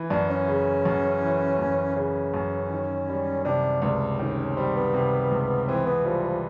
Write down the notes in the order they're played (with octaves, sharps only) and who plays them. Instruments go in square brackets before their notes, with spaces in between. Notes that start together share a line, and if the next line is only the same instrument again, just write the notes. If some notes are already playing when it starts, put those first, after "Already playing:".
Already playing: [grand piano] E3
[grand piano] F#2 [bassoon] D4
[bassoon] C#4
[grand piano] C#3
F#2
E3
F#2
[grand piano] C#3 [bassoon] C#4
[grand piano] F#2
D#3
G3
[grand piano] C3 [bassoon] D4
[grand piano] C#2 [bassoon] D4
[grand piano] D#3 [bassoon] C#4
[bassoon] C#4
[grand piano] G3 [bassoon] C4
[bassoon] B3
[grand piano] C3
C#2
[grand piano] E3 [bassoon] C4
[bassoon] B3
[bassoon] F3 [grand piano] G3
[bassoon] F3